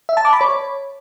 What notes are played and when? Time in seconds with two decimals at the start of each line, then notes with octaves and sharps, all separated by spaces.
0.09 E5
0.17 A5
0.25 D6
0.33 B5
0.41 C#5